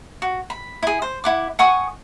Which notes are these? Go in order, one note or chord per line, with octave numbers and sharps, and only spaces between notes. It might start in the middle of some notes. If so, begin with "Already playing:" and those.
F#4
B5
E4 G#4
C5
E4 F#5 D6
F#5 G#5 C#6 D#6